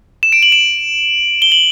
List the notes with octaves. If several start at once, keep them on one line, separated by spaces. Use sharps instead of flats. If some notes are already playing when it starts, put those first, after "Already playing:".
E7
D7
F#7
E7
G7
F#7